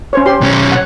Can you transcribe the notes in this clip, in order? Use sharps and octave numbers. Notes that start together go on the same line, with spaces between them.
C#4 C5 C#5
G4 C5 C6
B1 C#4
F#5